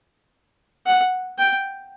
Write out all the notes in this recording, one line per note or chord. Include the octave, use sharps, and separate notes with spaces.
F#5
G5